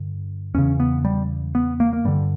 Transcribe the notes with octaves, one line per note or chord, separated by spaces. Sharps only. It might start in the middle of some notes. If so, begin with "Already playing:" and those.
Already playing: G2 D3
E2 C#3 C#4
B3
G3
B3
A#3
A#3
G2 D3 G3